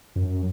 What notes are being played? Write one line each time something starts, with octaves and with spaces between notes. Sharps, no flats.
F#2